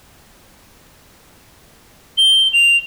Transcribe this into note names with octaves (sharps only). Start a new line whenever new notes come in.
G7
F7